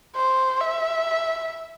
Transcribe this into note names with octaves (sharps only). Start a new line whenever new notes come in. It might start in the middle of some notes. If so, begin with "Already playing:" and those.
C5
E5